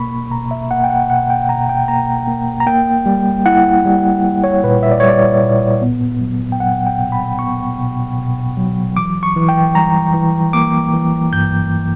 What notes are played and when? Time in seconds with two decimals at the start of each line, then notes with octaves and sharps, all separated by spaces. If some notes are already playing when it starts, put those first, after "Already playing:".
Already playing: B2 A#3 B5 C#6
0.31 B2 A#5
0.51 E5
0.71 A#3 F#5
0.84 G5
0.90 F#5
1.09 B2 F#5
1.30 G5
1.49 B2 A#5
1.69 G5
1.88 A#3 A#5
2.28 A#3
2.60 A#5
2.67 A#3 G5
3.06 G3
3.46 E4 F#5
3.86 G3
4.24 G3
4.44 C#5
4.64 A#2 B4
4.83 E5
4.91 D5
5.00 C#5
5.04 G3 D5
5.43 A#2
5.82 B3
6.21 F#3
6.52 G5
6.60 F#3 F#5
6.87 G5
7.00 B2
7.12 B5
7.39 B3 C#6
7.79 B2
8.18 B2
8.57 F#3
8.97 E3 D6
9.23 C#6
9.36 E3
9.49 G5
9.75 G3 A#5
10.14 E3
10.53 A#3 D6
10.93 E3
11.33 G2 G6